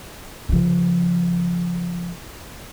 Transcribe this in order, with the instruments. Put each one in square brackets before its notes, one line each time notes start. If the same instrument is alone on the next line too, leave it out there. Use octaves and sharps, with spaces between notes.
[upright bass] C#3 F3